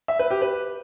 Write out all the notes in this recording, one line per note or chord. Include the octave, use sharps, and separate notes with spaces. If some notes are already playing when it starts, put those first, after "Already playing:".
E5
B4
G4
B4